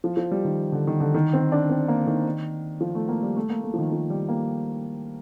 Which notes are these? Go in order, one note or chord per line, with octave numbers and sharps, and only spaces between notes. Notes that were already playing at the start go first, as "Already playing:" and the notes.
F3
F3
G3
D#3
D3
D#3
D3
D#3
C4
D4
C4
A#3
D#3
F3
A3
A#3
G3
A3
A#3
A3
F3
D#3
F3
G3
A#3